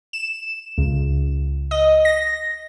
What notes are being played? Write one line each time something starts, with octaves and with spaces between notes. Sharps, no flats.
E7
C#2
D#5
A#6